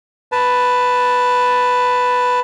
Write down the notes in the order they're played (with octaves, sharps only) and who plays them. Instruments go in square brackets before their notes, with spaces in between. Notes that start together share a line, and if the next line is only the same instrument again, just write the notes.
[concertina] B4 A5